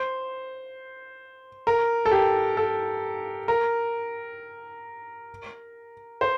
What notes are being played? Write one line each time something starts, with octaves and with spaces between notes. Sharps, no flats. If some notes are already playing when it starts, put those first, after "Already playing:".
Already playing: C5
A#4
A4
G4
A4
A#4
C5